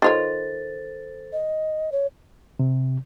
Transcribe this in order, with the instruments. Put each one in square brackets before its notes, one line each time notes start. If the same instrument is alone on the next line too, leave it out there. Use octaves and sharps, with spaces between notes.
[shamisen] D#3 F4 C#5 [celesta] A4 C5 A6
[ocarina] D#5
C#5
[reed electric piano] C3